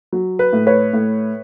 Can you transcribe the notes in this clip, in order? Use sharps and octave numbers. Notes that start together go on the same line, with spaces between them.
F#3
B4
A2
B4 C#5
A2